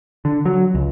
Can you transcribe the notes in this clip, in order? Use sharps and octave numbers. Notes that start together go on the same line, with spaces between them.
D3
F#3
C#2